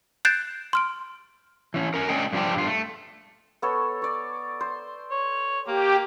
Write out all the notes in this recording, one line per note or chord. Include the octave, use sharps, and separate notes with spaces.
F#6 G6 A6 C7 D7 E7
C6 F6 D7
E3 C#4
C#4 A#4
G#3 C#4 D4 G#4 D#5 G5
G2 C#3 F3 G3 G4 A5
G2 F4
A3
B3 A4 C#5
C#5 D5
C5
C#5
A#3 G4